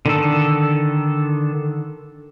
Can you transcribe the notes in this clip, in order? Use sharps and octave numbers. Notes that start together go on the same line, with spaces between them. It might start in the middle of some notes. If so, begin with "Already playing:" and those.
D3 D#3 A4